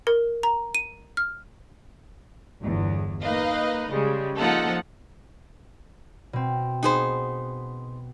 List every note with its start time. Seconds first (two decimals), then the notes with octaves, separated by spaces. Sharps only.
0.07 A#4
0.43 A#5
0.75 D#7
1.17 F6
2.60 G1 E2
3.21 A#3 D#4 B4 D#5 F5
3.91 C#3 G3 G#3
4.38 F3 A#3 D#4 F4 A4 F#5
6.33 B2 C4
6.83 B3 D#4 G#4 C5